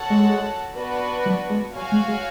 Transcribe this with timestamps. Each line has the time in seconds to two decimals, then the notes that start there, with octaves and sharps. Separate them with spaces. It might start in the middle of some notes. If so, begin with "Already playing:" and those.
Already playing: F#4 A4 C#5 F#5 A5
0.10 G#3
0.75 B3 D4 F#4 B4
1.26 F#3
1.50 G#3
1.75 F#3 F#4 C#5 F5 G#5
1.92 G#3
2.08 G#3